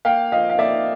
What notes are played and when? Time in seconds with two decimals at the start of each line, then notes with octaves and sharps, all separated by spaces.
0.05 A#3 F5 G5
0.32 F3 D#5 F5
0.50 F5
0.58 A#3 D5 E5